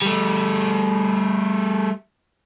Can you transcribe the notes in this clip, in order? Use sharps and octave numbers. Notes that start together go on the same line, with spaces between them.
G3 A3